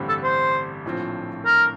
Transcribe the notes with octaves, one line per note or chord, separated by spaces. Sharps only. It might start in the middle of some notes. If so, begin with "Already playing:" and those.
Already playing: A1 G2 D3 G3 C4
A4
C5
A#1 A2 F3 C4
A#4